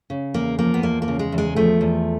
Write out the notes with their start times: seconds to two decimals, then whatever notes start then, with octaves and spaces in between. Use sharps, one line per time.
0.10 C#3
0.34 E2 A#3
0.58 F3 A#3
0.74 B3
0.83 E2 A#3
1.02 A#3
1.08 C#3
1.19 G#3
1.32 E2
1.38 G#3
1.56 F3 A3
1.81 E2